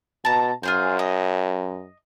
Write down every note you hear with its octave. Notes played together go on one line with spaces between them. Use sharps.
B2 A5 A#5
F#2 F4 G#4 C5
D#5